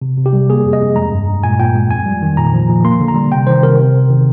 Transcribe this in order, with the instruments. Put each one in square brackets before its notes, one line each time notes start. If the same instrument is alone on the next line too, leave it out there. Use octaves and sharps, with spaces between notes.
[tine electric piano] C3
C3
G4
G3
A#3 G#4
F2
D#5
F2
G#3 A#5
G2
G2
A#2 G#5
A#2 G5
G#3
F2 G#5
G3
D#3
A#2 A#5
F3
A#2
A#3 C6
D3
A#5
G3
C3 G5
D#3 C5
C3 A#4
C3
C3
D#3